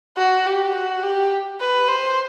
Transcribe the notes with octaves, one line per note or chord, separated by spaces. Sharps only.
F#4
G4
F#4
G4
B4
C5